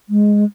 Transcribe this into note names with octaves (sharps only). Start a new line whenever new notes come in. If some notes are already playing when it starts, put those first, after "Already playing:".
G#3